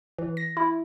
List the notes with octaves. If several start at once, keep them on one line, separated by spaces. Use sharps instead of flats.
E3
A#6
E4